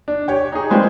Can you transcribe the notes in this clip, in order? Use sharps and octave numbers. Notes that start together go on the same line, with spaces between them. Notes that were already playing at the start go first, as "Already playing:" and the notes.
D4
G4 C#5 G5
D#4 G#4
F3 G3 G#3 A#3 C4 B4